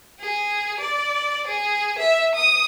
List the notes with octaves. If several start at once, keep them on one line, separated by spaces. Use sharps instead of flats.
G#4
D5
G#4
E5
D#6